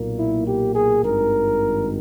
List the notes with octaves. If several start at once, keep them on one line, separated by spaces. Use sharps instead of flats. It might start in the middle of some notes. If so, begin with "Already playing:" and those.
Already playing: B1 A#2 A#3
E4
G4
G#4
G#1 G2 D#3 A#4